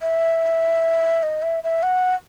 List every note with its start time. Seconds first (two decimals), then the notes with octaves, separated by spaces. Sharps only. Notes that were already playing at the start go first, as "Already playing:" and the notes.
0.02 E5
1.23 D#5
1.42 E5
1.64 E5
1.83 F#5